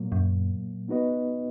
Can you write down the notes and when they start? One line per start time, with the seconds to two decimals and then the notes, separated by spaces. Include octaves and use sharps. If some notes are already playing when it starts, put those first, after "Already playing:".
Already playing: A#2 F#3 A#3
0.12 F#2
0.88 B3 D#4 F#4 B4 D#5